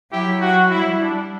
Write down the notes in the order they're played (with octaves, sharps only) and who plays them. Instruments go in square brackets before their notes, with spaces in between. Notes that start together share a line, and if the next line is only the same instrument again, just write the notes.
[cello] F#3 [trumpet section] E4 G4
[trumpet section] F#4
[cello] G3 [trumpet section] E4
[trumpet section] D4